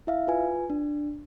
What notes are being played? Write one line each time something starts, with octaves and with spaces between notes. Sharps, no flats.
E4 E5 F5
F4 B4 G#5
D4